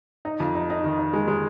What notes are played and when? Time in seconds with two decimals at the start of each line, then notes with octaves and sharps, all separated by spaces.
0.25 D#4
0.40 F2
0.55 D#4
0.70 D#4
0.84 D#3
0.99 D#4
1.13 G#3
1.28 G#3